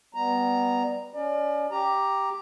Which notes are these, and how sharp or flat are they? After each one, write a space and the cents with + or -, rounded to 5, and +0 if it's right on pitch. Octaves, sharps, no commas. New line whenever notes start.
G3 +5 B3 +0 A#5 +0
C#4 +30 D5 +35
G4 +0 A#5 +0